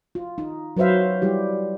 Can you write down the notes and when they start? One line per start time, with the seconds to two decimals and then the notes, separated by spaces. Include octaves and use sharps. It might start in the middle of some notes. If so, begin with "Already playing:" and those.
0.15 F4
0.38 D#4
0.77 F#3 B4 C5 E5 F5
1.22 G3 E4 G4